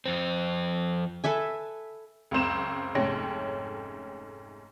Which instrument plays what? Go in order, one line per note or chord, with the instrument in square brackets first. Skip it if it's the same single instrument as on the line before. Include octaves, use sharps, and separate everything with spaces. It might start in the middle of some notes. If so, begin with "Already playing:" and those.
[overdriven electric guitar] F2 C4
[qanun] A4 B4 E5 G#5
[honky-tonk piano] C#2 F#2 C4 E7
F1 G#2 A3 C#4 G5 A#6